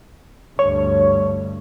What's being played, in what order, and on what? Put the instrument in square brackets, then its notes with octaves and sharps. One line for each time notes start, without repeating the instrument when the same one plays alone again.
[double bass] D2 G2 [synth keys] C#5